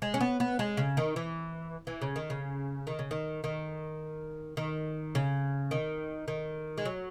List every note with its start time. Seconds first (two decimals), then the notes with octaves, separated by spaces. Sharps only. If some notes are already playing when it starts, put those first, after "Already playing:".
0.02 G#3
0.14 C#4
0.20 B3
0.40 B3
0.59 G#3
0.77 C#3
0.97 D#3
1.16 E3
1.87 E3
2.01 C#3
2.16 D#3
2.30 C#3
2.87 D#3
2.99 C#3
3.11 D#3
3.44 D#3
4.57 D#3
5.15 C#3
5.71 D#3
6.28 D#3
6.78 G#3
6.85 F#3